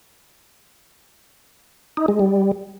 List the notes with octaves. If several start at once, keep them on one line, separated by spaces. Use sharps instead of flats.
D#4
G#3
G3